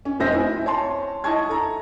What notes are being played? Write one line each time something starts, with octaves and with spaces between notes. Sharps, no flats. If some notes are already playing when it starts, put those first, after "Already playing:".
C#4
F1 C4 C5 D#5 E5 A#6
E4 G#5
C#5 A5 C6
E4 D#5 A5 C#6 G#6
A4 A#5